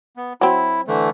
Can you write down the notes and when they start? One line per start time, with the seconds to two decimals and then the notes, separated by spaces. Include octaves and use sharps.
0.17 B3
0.41 F#3 C4 E4
0.88 D3 E3 A3